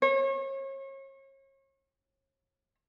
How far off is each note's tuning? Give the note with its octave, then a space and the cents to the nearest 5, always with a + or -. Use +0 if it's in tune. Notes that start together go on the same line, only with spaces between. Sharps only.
C#5 -35